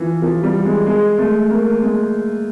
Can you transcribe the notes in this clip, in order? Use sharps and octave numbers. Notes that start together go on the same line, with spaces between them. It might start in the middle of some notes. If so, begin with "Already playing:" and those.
Already playing: E3 F3
F3
G3
G#3
G#3
A3
A#3
G#3